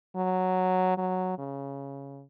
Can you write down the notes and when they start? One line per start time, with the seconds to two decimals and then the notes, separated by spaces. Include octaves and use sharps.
0.16 F#3
0.98 F#3
1.38 C#3